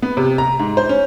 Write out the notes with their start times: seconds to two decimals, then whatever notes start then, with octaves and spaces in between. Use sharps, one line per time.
0.02 B3
0.17 C3
0.38 A#5
0.59 G#2
0.77 C5
0.89 C#4